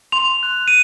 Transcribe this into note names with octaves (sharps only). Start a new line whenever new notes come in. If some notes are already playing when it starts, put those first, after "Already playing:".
C6 F7
F#6
D#7